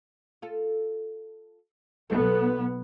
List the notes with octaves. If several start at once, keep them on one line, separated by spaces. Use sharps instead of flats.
F4 A4
B1 B3 A4